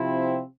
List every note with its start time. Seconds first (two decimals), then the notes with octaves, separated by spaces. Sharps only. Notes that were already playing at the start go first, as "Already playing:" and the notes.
Already playing: C3 F3 C4 E4